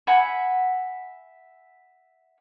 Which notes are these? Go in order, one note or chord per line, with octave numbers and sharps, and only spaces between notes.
E5 F#5 G#5 B5